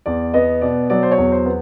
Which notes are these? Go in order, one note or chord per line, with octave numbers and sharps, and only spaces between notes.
E2 D5
B3 D#5
B2 D5
F#3 D5
C5
C#5
E2
C5
B3